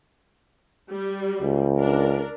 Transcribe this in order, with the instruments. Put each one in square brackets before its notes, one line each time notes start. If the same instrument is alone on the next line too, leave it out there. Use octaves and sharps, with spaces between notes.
[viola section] G3
[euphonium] C#2
[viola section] D4 A#4